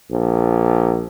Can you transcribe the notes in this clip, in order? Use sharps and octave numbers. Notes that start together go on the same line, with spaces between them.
A#1